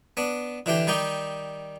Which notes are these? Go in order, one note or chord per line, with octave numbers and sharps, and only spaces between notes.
B3 D4
D3 E3 D4 G4
D#3 G3 D#4 G4